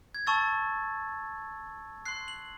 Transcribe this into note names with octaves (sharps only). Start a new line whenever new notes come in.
G#6
A5 C#6 E6 A6
C6 F#6 C7
F#7